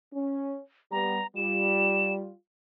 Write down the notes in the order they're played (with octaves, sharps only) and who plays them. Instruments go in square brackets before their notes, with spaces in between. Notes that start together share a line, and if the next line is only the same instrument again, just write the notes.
[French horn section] C#4
[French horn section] G3 B3 [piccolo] A#5
[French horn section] G3 F4 [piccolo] E7